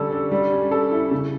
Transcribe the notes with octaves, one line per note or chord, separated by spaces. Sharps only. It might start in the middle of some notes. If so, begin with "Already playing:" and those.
Already playing: D3 G3 C#4 A4
D4
G3
C#4
A4
E4
C#3